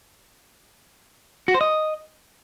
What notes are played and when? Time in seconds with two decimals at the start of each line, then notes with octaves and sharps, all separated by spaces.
1.48 F#4
1.54 C5
1.61 D#5